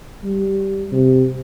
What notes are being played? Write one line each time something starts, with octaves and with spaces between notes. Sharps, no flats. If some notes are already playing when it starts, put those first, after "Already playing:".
G3
C3